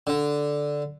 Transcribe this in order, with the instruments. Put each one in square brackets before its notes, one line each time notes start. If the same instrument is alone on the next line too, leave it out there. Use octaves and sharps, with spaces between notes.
[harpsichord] D3